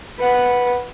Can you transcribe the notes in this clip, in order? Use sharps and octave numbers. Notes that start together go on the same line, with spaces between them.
B4 F#5